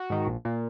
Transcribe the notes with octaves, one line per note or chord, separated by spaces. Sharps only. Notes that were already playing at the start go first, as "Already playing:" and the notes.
Already playing: F#4
G#2 D#3
A#1
A#2